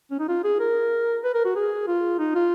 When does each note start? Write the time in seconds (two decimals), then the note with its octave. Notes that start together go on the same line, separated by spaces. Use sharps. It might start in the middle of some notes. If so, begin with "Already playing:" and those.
0.11 C#4
0.20 D#4
0.28 F4
0.44 G#4
0.60 A#4
1.24 B4
1.34 A#4
1.45 F#4
1.56 G#4
1.87 F4
2.19 D#4
2.35 F4